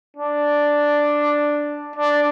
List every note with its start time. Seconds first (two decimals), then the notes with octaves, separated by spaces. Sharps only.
0.17 D4
1.96 D4